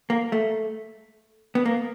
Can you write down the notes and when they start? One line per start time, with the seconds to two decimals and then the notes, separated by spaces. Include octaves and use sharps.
0.10 A#3
0.32 A3
1.55 B3
1.65 A#3